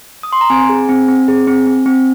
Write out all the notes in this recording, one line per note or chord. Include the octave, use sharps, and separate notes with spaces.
D#6
C6
A#5
C4 G#5
G#4
C4
C4
G#4
C4
C4
C4